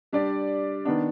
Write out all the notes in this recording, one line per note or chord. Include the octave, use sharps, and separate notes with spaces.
G3 D4 G4 D5
D#3 B3 D4